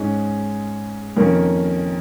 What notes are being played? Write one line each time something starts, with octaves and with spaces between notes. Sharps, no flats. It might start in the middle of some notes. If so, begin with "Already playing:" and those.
Already playing: G#2 G#3 C#4 G#4
F2 D#3 A#3 C#4